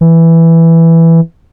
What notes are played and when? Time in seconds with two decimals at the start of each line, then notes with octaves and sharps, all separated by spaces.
0.01 E3